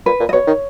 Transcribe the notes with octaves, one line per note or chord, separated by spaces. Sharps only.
A#2 B4
A#2
D#5
B2 C#5
D#3